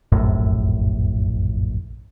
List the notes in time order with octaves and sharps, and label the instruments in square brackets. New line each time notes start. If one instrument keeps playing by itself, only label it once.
[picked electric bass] F1 A#1 F#2 A2